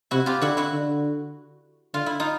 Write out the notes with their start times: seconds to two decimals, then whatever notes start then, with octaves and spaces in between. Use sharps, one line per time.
0.11 C3 E4 F#4
0.26 F4 G4
0.41 D3 E4 F#4
0.57 E4 F#4
0.73 D3
1.94 D3 F4
2.06 E4
2.20 D#4 F4